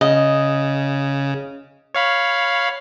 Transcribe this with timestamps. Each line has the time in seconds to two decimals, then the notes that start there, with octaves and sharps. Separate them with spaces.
0.01 C#3 D#5
1.95 C#5 F5 B5